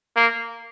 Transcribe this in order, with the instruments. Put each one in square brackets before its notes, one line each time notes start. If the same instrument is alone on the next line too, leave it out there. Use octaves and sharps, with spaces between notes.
[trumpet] A#3